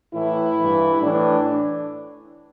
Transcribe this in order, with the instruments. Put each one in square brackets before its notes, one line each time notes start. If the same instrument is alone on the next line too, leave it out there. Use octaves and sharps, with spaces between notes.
[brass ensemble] A2 E3 E4
G2 E3
A2 E3 D4